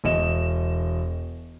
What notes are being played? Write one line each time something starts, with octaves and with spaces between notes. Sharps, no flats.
E1 D#5 E7